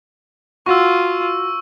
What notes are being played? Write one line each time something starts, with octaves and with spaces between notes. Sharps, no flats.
F4 F#4 C#6 E6